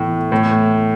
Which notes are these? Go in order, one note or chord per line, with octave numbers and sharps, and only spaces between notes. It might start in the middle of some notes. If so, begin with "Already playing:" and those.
Already playing: A2 E3 B3 E4 A4
A2